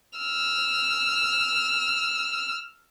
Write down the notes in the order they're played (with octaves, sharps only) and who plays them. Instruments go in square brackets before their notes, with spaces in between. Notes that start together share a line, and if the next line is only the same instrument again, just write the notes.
[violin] E6 F6